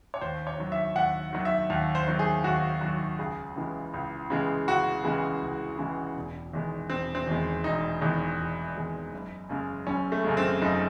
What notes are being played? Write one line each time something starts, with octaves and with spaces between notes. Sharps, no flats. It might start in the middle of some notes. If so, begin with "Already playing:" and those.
C#5
D#2 C5
C#5
D#3 F#3
E5
D#2 F#5
D#3 F#3
E5
D#2
C5
D#3 F#3
G#4
D#2 F#4
D#3 F#3
C#2 G#4
C#3 E3 G#3
C#2
C#3 E3 G#3
C#2 F#4
C#3 E3 G#3
C#2
C#3 E3 G#3
E1
E2 D#3 G#3
E1 C4
C4
E2 D#3 G#3
E1 D#4
E2 D#3 G#3
E1
E2 D#3 G#3
F#1
F#2 C#3 G#3
F#1 C#4
A3
F#2 C#3 G#3
C4
F#1 D#4